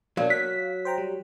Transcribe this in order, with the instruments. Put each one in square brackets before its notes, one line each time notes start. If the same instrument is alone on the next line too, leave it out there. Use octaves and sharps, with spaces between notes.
[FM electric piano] B2 A#3 D4 [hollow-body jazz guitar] F#3 [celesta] A#4 D5 F5
[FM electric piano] F5 [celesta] F#6 [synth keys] B6
[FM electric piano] C5 G5 A#5
G3